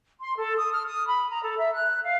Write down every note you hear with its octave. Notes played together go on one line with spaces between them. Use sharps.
C6
A4
D#6
F6
D#6
B5
A#5
A4
E5
F#6
F5